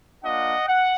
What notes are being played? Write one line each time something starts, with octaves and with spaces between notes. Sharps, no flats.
A#3 D4 F4 D#5 F#5
F#5